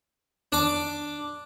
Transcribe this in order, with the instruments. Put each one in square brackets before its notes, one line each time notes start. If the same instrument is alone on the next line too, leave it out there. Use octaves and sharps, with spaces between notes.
[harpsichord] D4 D6